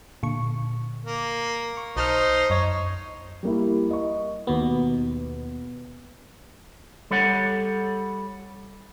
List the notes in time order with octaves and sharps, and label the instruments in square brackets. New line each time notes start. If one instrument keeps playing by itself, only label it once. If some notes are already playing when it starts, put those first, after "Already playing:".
[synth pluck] A#2 D3 C#6
[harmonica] A#3
[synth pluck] C#6
[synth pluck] B1 A5 F6 [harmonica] D#4 C5
[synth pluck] F#2 D#5 [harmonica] C#5
[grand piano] G3 A#3 E4
D#5 C#6
[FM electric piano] D#2 B2 B3
[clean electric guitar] G3 A4 C#5 F#5